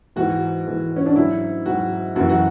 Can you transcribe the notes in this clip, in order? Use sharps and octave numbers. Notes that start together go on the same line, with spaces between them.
G#2 E3 F#4
G#2 E3
C#4
D4
G#2 F#3 E4
G#2 F#3 F#4
F#2 E3 F#4
F#4